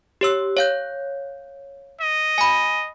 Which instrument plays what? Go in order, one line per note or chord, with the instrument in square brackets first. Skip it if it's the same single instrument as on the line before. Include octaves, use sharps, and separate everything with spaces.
[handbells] G4 C#5 E6
C#5 F5 G6
[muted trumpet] D#5
[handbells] G#5 B5